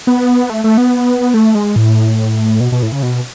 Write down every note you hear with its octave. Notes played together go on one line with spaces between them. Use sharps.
B3
A3
A3
B3
A3
G#3
A2
B2
B2
A2
C#3
B2